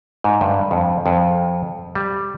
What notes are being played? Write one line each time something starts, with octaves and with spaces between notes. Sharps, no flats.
G#2
G2
F2
F2
G3